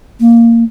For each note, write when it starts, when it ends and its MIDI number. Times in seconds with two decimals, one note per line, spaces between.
0.21 0.63 58